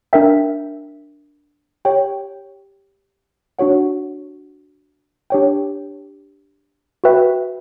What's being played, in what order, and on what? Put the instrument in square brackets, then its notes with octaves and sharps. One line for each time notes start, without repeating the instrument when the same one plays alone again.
[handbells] D4 A#4 E5 G5
G4 C#5 G5
D4 F#4 C#5 F#5
D4 G4 C#5 G5
F#4 B4 E5 G5